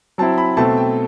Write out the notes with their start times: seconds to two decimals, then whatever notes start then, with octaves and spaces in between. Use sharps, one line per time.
0.18 F#3 C4 E4 A5
0.38 B5
0.57 B2 A3 C4 A5
0.77 G5